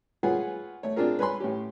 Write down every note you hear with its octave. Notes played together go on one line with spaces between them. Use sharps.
F4 G#4 B4 C#5 F#5 G#5
A3 C#5
C4 D4 F4 G#4 A#4
B4 C#5 G#5 B5 C6
A2 C#4 G4